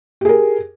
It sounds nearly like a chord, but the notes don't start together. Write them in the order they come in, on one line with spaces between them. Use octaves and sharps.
G4 G#4 A#4